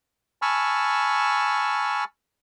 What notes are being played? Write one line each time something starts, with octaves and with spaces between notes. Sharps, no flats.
G#5 A5 B5 C#6 E6 F6